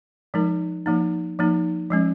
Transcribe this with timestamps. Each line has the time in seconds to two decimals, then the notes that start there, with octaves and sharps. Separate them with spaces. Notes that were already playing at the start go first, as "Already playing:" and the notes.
0.34 F3 G#3 D#4 A#4
0.86 F3 A#3 D#4
1.39 F3 A#3 D#4
1.91 F3 G#3 C#4